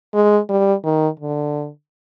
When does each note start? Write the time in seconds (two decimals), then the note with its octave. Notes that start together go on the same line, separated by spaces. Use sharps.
0.14 G#3
0.49 G3
0.84 D#3
1.20 D3